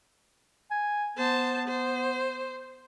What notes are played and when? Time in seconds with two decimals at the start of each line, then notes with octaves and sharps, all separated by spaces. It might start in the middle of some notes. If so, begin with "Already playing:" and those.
0.71 G#5
1.17 B3 C5 A5
1.67 C5